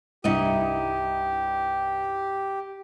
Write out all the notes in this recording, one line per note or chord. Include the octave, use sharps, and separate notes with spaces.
C2 G2 D#4 E4 G4 D#5